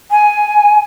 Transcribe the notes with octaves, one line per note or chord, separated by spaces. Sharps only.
G#5